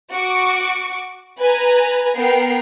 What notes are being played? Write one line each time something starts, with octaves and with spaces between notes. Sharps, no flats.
F#4 C#6 D6
B4 G#5 A#5
B3 A#4 G5 C7